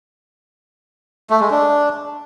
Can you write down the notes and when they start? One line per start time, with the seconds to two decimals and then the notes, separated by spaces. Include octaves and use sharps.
1.30 A3
1.40 G#3
1.51 D4